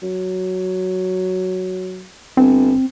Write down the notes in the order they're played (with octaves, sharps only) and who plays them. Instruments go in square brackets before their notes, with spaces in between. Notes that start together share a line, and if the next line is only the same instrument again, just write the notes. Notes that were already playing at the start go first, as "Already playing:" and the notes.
[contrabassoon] F#3
[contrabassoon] G1 [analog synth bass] C4